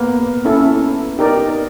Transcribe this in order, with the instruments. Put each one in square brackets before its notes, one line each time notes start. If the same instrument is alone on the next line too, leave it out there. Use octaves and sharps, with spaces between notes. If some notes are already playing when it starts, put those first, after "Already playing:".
Already playing: [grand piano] A#3 B3
[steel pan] C#4 E4 A4
D#4 G4 A#4 D5